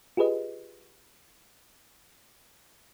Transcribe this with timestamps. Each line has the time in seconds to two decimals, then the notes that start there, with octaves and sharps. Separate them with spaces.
0.17 F4 G4 G#4 B4 D#5